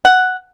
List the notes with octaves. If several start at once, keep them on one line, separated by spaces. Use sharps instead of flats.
F#5